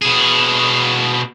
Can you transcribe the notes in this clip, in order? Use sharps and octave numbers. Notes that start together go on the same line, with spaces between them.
B2 G#4